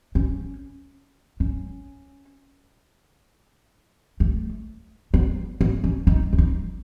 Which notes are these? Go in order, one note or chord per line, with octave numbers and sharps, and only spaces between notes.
C#4
C#4
A3
B3
B3
C#4
D#4
C#4
D#4